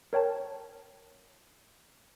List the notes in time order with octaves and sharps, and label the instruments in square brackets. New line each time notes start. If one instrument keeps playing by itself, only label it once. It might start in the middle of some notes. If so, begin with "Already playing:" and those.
[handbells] A#4 C#5 G5 A5